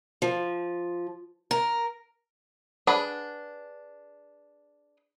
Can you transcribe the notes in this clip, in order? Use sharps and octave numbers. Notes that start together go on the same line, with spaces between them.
F3
A#4
D4 G#4 B4 F#5